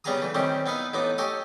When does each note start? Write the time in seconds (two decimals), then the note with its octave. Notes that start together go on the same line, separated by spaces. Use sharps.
0.04 C#3 G3 B3 G#4 A#5 D#6
0.22 E3 A3
0.35 D#3 G3 C4 C#4 G4
0.66 B3 D#4 E4 F5
0.93 A1 A2 B3 D#4 D6
1.18 G4 A4 C#5 D#5 G#5